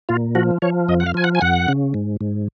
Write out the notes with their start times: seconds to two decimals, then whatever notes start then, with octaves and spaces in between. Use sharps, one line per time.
0.09 A#2 F4
0.35 F3 F#4
0.62 F3 C#5
0.88 F2 D#5
1.00 F#5
1.06 F5
1.14 F3 G#5
1.24 F#5
1.35 G#5
1.41 F2 F#5
1.68 C#3
1.94 G#2
2.21 G#2